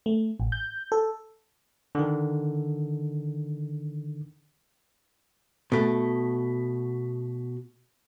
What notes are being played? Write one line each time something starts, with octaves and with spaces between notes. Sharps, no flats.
A3
A1
G6
A4
D3 D#3
B2 A3